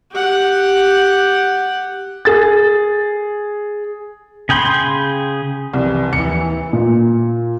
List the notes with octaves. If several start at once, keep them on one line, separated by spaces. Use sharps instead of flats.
G4 F#5
G#4 A6
C#3 G#4 G5 B5 C6
C2 C3 E3
D#2 E3 C#7
A#2